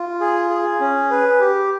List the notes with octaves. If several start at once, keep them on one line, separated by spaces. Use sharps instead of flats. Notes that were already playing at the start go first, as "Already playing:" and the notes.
Already playing: F4
G#4
G#4
C#4
B4
G4